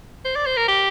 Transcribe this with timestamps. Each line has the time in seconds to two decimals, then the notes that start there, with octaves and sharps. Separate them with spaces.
0.25 C5
0.36 D5
0.46 C5
0.57 A#4
0.68 G4